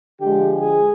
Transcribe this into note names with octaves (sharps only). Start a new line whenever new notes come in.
D3 F3 G#3 G4
G#4